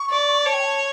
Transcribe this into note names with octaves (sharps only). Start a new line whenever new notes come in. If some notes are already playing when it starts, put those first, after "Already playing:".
Already playing: C#6
D5
C#5 A5
G5
A5